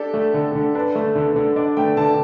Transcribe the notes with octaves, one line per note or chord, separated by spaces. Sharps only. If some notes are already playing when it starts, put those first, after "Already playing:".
Already playing: D4 G4 A4
A3
D3
D3
D4 B4
A3
D3
D3
D4 D5
A3 G5
D3 A5